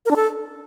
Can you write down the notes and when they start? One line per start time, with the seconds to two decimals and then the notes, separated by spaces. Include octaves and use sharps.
0.06 A#4
0.11 D4
0.16 A4